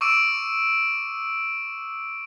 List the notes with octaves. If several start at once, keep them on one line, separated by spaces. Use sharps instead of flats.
C#6 D6 E6 D7 D#7